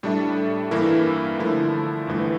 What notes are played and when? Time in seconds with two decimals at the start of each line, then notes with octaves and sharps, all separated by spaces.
0.03 A2 G3 D4 A4 E5
0.71 G2 E3 A#3 E4 A#4
1.39 D3 F3 A3 E4
2.07 G1 G2 E3 A3